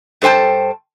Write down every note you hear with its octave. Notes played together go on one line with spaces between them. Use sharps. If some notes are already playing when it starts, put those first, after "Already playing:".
G2 A4 C5 G5 A5